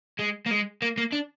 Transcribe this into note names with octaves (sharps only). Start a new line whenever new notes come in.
G#3
A#3
G#3
A#3
A#3
D4